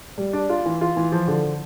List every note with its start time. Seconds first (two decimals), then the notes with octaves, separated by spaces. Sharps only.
0.18 G3
0.33 D4
0.50 F4
0.66 E3
0.81 F4
0.97 E3
1.12 F3
1.28 D3